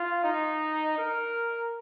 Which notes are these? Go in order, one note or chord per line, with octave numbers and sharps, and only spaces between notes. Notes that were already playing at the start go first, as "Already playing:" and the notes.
Already playing: F4
D#4
A#4